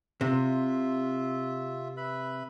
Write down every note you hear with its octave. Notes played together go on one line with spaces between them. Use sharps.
C3 F4 E5
B4 E5 B5